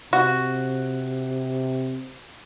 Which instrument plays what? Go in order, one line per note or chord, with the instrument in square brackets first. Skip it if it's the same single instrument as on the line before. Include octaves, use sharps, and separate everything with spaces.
[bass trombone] C3 [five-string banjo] F#4